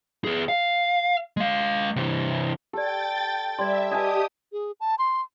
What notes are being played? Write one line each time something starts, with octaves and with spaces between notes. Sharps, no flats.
B3 G#4
F5
G#3 F5
C3 E3
G4 A4 D5 G5 A6
G3 D5 E5 C6
G4 D5 D#5 G#5 A5 D#6
G#4
A5
C6